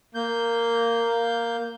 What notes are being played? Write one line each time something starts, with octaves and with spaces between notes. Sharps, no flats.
A#3 G6